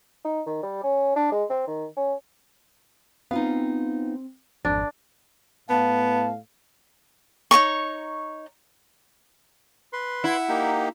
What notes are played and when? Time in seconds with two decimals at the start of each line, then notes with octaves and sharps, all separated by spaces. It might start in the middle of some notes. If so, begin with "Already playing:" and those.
0.24 D#4
0.46 D#3
0.63 G3
0.83 C#4
1.16 D4
1.32 G#3
1.50 C4
1.67 D#3
1.96 C#4
3.31 B3 C4 D#4 F4 F5
4.65 G#1 F2 D4
5.69 A2 B3 F5 A5
7.51 D#4 C#5 A#5 C#6
9.93 B4 C6
10.24 E4 F#5
10.49 A#3 D#4 G4